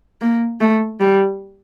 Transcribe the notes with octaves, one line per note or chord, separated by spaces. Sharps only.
A#3
A3
G3